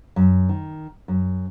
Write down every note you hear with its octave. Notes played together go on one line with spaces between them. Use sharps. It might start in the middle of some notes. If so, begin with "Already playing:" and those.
F#2
D#3
F#2